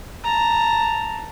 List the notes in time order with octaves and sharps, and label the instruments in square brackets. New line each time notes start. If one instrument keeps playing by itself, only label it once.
[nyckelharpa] A5 A#5